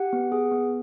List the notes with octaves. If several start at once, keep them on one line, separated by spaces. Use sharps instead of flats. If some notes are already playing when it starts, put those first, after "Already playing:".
Already playing: G4 F#5
B3
G#4
B3